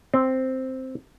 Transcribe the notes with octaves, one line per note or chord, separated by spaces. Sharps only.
C4